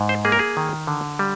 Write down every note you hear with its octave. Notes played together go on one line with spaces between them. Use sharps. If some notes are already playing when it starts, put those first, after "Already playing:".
Already playing: G#2
C5
A#3 G#4
A#4
G#4
D#3
D3
G3